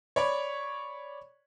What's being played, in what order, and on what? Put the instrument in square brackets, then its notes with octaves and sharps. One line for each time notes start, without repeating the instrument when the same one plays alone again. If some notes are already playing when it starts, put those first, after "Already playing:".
[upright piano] C#5 D5 B5 C#6